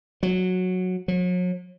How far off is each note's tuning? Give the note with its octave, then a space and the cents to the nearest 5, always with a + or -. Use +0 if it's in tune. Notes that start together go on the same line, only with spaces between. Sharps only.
F#3 -10
F#3 -40